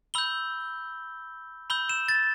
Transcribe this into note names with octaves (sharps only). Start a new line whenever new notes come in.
B5 E6 G6 G7
B5 E6 G6 G7
E7
A6